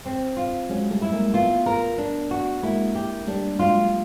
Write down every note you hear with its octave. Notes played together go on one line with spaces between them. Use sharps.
C4
F4
F#3 G#3 C#4
G3 A3
E4
G#3 A#3
A3 B3 F4
A#4
D4
F#4
G#3 A#3 E4
G4
G3 A3 D4
F#3 G#3 F4